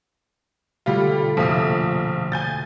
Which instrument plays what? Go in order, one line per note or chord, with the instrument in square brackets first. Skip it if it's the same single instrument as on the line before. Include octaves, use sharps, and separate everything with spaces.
[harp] B2 D3 A3 [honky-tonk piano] G3 F4
[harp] F1 E5 [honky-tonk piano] A#1 F4 D#6
[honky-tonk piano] G#5 G6 A6